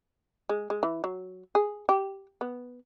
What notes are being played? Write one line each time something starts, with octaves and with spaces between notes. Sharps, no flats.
G#3
G#3
E3
F#3
G#4
G4
B3